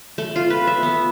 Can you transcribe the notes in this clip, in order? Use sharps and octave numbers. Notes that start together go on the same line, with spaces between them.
A3
F4
B4
E5
B3